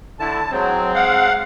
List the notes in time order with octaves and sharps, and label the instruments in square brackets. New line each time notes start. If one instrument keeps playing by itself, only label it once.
[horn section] A2 D3 E4 [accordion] A5
[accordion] F#3 [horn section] G#3 C4
[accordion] F5 F#5